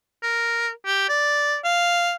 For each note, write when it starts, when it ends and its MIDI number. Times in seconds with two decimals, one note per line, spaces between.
0.23 0.70 70
0.86 1.09 67
1.09 1.58 74
1.65 2.15 77